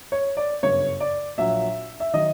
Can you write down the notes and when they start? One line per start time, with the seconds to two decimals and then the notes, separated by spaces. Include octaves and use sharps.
0.12 C#5
0.37 D5
0.63 G1 F#2 C#3 C#5
1.00 D5
1.38 A#1 A#2 F#3 E5
2.00 E5
2.14 D#3 F#3 D#5